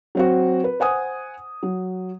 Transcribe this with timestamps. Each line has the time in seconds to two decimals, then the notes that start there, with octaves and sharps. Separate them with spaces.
0.15 F#3 C4 F#4
0.64 B4
0.80 C5 F#5 G#5 D#6
1.63 F#3